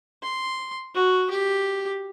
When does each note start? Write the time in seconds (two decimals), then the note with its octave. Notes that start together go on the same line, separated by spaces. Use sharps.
0.23 C6
0.95 F#4
1.30 G4